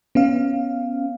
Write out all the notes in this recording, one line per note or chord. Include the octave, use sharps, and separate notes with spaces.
B3 C#4 F5